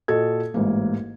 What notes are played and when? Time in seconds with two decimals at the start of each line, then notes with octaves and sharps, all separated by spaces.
0.08 A#2 F4 F#4 A4 D#5 G#6
0.54 A1 G#2 A#3